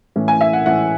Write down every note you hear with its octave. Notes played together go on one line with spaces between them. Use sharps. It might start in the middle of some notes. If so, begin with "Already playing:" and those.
A2 E3 A3 C#4
G#5
E5
F#5
A2 E3 A3 C#4 F#5